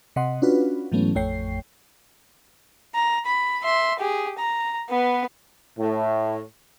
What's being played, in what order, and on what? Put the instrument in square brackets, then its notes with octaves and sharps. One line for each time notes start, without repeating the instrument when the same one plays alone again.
[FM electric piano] C3 D#5 F#5 C6
C#4 D4 F4 F#4 B4
G#2 E3 F#3 A3 B3 C#4
A1 F2 A3 C#5 G5 C7
[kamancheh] A#5
B5
E5 C6
G4 G#4
A#5
B3 B4
[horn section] A2